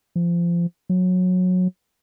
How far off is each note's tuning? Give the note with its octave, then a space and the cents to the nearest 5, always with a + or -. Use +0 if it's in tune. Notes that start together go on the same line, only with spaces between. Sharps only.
F3 -25
F#3 -20